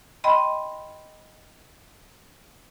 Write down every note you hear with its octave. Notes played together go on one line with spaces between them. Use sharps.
D#5 G5 B5 C6